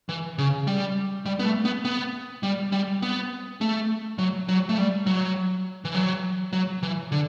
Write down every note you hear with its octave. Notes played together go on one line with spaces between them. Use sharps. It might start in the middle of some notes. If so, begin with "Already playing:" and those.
E3
C#3
G3
G3
B3
A3
B3
B3
G3
G3
B3
A3
F#3
F#3
A3
G3
F#3
E3
F#3
F#3
E3
D3